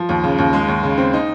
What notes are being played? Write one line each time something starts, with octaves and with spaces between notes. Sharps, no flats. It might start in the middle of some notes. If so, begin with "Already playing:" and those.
Already playing: F3
D#2
C#3
D#2
G#3
D#2
C#3
C4
D#4